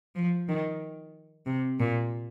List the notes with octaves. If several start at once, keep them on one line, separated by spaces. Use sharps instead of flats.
F3
D#3
C3
A#2